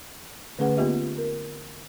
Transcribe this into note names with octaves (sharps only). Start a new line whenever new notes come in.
D3 A3 C#4 G#4 B4 F#5
A#3 B3 F4 G4 D#5 E5
A#4